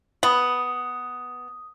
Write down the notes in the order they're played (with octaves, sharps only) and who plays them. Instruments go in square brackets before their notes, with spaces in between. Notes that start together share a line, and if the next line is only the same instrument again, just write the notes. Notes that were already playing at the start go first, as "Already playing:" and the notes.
[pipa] B3 [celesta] D#6